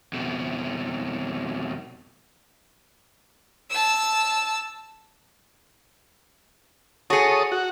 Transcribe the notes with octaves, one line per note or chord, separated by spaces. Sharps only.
F2 B2
A5 E6
F#4 G#4 A4 C#5 D#6
F#4